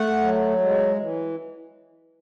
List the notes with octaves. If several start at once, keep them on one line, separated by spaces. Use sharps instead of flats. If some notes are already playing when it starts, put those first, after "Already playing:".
Already playing: A3 F#5
F#3
G#3
E3